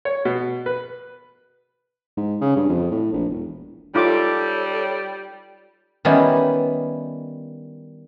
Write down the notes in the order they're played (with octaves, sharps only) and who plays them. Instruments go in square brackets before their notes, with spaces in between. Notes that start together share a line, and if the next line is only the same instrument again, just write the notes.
[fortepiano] C#5
B2
B4
[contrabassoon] G#2
C#3
G2
F2
A2
A#1
E1
[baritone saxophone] G3 [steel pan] D#4 F4 D6 [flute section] A4 C#5
[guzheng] D#3 G3 B3 C#4 E4